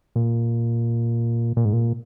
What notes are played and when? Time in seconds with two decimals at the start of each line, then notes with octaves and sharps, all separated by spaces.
0.16 A#2
1.57 A#2
1.65 G#2
1.73 A#2